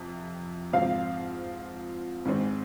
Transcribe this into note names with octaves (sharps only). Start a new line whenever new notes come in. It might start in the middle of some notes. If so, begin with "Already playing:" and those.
Already playing: F2 C3
G#2 F3 C4 F5
G#2 D#3 G#3 C4